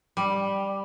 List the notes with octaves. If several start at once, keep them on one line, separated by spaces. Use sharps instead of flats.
G3